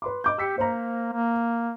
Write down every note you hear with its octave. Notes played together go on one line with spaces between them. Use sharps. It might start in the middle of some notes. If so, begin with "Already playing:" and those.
B4 C6 D6
D#5 D6 G6
G4 E6 B6 C#7
A#3 C5 A#5
A#3